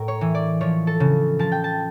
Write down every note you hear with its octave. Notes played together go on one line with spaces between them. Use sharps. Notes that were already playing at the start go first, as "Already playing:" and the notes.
Already playing: A2 A#4
C#5
E3
D5
F3 C#5
A4
C#3
F3 A5
G5
A5